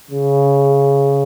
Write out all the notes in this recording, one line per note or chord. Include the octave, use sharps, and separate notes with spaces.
C#3